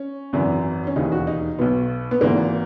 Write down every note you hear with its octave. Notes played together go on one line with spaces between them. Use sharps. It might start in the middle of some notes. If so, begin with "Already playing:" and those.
Already playing: C#4
G#1 F#2 E3
C#4
E1 D#2 C#3 E3 D#4
F#4
D#4
B1 B2 B3
B3
G#1 G#2 E3 A#3